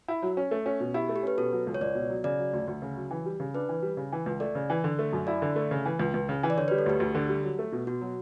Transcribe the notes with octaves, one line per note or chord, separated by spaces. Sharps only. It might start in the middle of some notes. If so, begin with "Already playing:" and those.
E4
F#3
C#4
A3
C#4
B2
E4 G4
A3
G4
C#4 B4
B2 A4
F#3
C#2
C#5
C#2 D5
B2
F#3
C#3 D5
F#3
D2
D2
C#3
F#3
E3
G3
C#3
D4 B4
E3
G3
C#3
E3
C#2
A3 D5
C#3
E3
D3
A3
F#2
E4 D5
D3
A3
C#3
E3
C#2
C#2
C#3
E3
D5
D3 C#5
B4
G3
A4
D2 G4
D2
D3
G3
F#3
A3
B2
B2 F#4
F#3